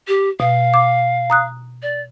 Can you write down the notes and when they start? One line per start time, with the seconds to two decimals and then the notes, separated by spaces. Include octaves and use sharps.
0.07 G4
0.40 B2 F5
0.74 D6
1.30 A#5 D#6 F#6
1.82 D5